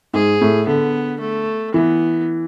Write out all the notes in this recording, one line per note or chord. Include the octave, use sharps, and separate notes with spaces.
G#2 G#4
A2
D3 B3
A3
E3 B3